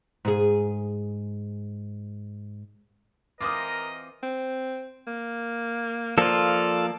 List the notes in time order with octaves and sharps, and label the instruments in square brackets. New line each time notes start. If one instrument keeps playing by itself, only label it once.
[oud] G#2 G#4
[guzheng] E3 C4 F4 [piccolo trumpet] A#4 [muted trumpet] D#5 [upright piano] D6 D#6
[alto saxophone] C4
A#3
[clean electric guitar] F3 A#3 [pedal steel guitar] F4 A4 [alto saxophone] D5